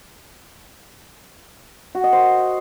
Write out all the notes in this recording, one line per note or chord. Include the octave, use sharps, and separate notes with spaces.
F#4
D#5
C5